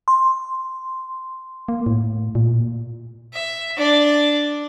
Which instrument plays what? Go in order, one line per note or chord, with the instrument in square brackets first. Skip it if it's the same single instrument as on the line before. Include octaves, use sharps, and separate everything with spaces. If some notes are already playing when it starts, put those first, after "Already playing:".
[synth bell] C6
[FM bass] A#3
A2
A#2
[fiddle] E5
D4 D5